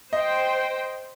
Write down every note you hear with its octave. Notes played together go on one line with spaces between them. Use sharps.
C5 D#5 G5